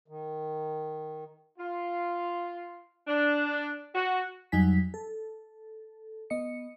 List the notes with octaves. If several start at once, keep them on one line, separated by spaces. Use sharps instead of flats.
D#3
F4
D4
F#4
F2 F#3 G3 D#4 G#5 B6
A4
B3 D#5 C#7